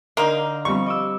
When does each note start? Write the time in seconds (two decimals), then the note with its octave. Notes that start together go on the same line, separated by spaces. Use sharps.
0.17 D3 A#3 D#4 C6 F6
0.65 F3 G3 C4 C#6
0.86 D#5 D6 E6